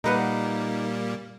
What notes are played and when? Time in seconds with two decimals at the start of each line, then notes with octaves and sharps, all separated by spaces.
0.04 A#2 G3 A#3 D#4 A#4 B4 F#5